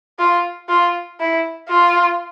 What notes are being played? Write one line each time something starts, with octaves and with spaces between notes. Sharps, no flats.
F4
F4
E4
F4